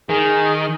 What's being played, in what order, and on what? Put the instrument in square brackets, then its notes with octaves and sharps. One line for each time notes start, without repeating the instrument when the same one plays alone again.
[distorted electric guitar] D#3 [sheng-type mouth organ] G#4